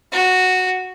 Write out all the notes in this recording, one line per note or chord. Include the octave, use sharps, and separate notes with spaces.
F#4